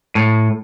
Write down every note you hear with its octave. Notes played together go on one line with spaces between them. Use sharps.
A2